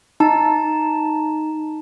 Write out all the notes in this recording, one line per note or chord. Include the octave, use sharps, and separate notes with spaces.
D#4 A5